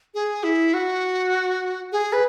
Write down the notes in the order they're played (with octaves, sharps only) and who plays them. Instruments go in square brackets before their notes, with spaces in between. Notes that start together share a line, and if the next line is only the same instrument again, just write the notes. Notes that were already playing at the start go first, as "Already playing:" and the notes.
[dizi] G#4
E4
F#4
G#4
B4